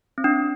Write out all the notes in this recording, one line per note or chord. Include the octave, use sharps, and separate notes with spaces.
C4
D4